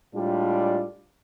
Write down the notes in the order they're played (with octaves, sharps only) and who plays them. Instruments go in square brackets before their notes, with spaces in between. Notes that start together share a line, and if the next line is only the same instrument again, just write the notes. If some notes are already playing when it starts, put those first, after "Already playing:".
[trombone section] A2 G3 G#3 D4 F4